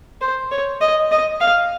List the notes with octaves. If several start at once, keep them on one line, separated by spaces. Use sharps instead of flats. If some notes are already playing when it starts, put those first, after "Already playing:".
C5
C#5
D#5
D#5
F5